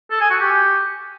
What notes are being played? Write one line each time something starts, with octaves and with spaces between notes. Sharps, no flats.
A4
G#5
F#4
G4